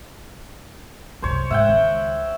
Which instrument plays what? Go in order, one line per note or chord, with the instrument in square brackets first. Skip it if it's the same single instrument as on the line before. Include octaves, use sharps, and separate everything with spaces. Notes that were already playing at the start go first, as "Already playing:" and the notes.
[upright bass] C2 F#2 [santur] C5 C#5
[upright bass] G#2 [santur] E5 F#5 G5
[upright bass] C#2 D#3